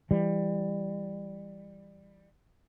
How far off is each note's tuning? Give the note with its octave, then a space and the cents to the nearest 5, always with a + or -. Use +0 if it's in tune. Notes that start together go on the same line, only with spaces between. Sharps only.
E3 +25 G3 +15